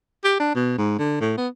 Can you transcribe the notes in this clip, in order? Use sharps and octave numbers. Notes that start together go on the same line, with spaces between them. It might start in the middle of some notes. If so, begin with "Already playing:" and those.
G4
D4
B2
G#2
D3
A2
B3